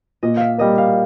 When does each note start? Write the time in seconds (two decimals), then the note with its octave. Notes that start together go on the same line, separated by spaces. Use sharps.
0.23 A#2 D#5
0.37 E5 F5
0.58 G3 A#3 D#5
0.78 F5